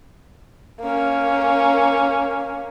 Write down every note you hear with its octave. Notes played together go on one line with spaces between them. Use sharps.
A#3 C#4